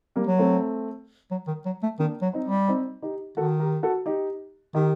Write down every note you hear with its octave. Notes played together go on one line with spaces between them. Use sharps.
G3 A#3
F#3
A3 C4
F#3
D#3
F#3
A3
D#3 A#3 D4
F#3
C4 D#4
G3
C4 D#4
D#4 G4
D#3 F#4 A4
G4 A#4
F#4 A4
D#4 G4
D#3 D#4 G4